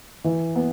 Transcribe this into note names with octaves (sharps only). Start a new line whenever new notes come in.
E3
B3